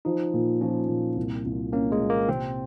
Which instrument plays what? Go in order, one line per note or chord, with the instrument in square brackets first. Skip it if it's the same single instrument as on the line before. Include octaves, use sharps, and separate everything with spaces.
[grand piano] F3 [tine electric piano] D#4
[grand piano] A#2
[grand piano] F3 [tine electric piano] C#4
[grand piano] A#2
C2
C2
[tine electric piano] A#3 [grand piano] C#4
[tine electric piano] G#3
[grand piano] A#2
[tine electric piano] A#3
[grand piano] C3 [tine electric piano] C4